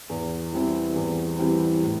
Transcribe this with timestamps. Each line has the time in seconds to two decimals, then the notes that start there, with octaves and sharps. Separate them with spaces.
0.09 E2
0.52 E3 G3 C4 E4
0.95 E2
1.38 E3 G3 C4 E4
1.82 A2